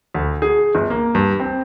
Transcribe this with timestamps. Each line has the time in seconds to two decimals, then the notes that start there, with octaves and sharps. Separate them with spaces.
0.14 D2
0.42 G#4
0.75 G1
0.90 A#3
1.15 G2
1.40 C4